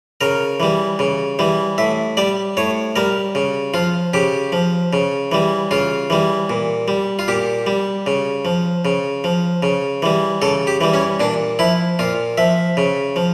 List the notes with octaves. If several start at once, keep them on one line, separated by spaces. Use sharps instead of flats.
C#3 A#4
E3 G3
C#3
E3 G3
A2 E5
G3 D5
A2 C#5
G3 A#4
C#3
F3 F4
C#3 G4
F3
C#3
E3 G3
C#3 F4
E3 G3
A#2
G3
F4
A#2 G4
G3
C#3
F3
C#3
F3
C#3
E3 G3
C#3 A4
G4
E3 G3
C#4
A#2 D4
F3 E4
A#2 F4
F3 E5
C#3
F3